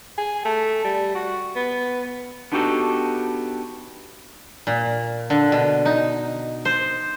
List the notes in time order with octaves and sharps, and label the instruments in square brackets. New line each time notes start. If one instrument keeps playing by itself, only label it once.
[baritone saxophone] G#4
A3
G3
F#4
B3
[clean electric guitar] B3 D4 D#4 F#4 G4 A4
[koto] A#2
D3
B2
D#4
C5